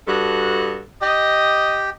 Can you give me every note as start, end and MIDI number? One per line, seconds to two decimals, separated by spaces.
0.07 0.79 43
0.07 0.79 66
0.07 0.79 69
1.01 1.90 67
1.01 1.93 75